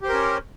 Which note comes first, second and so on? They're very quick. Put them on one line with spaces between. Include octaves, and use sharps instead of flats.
G4 C5 A#4 C#4